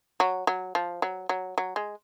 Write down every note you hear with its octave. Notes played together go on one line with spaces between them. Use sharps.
F#3
F#3
F3
F#3
F#3
F#3
G#3